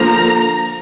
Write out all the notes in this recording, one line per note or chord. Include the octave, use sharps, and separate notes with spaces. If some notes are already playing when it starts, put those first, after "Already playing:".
Already playing: D3 F3 A#3 A#5